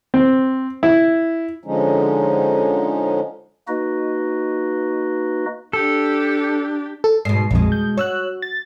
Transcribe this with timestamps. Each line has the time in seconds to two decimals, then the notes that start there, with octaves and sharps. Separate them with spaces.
0.14 C4
0.83 E4
1.64 D3 F3 G#3 C#4 D#4
3.68 A#3 D#4 F#4 B4 D#5
5.73 D4 G4 A4
7.04 A4
7.25 G#2 B2 C7
7.51 A#1 F2 B2 G#3
7.72 G6
7.97 F#4 C#5 E6 F#6
8.42 A6